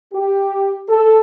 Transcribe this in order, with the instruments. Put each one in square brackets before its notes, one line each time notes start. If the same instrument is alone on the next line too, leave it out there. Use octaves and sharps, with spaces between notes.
[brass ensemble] G4
A4